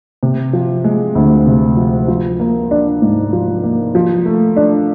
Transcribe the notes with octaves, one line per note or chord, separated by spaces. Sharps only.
C3
F3
G#3
D2
C3
F3
F3
A#3
D4
G#2
F3
A#3
F3
A3
D4